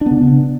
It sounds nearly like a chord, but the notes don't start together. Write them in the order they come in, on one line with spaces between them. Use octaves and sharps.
D4 B3 C#3